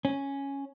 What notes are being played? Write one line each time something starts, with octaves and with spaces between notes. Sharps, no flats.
C#4